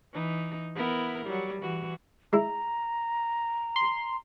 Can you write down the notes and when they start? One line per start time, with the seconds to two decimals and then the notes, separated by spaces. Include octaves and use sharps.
0.13 E3 D#4
0.75 B3 E4 A#4
1.25 F#3 G3
1.62 E3 F#4
2.33 G#3 E4 A#5
3.76 C6